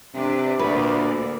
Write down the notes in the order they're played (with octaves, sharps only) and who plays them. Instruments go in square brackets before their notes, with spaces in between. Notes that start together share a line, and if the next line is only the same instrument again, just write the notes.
[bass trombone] C3 [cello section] D4 B4
[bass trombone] D2 [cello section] A#2 A#3 D5 [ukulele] B4